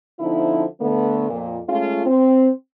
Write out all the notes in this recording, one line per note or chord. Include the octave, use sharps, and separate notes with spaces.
D3 F3 C4 D#4 E4
D3 A3 B3
F2 A#2
G#3 A3 C#4 F4
C4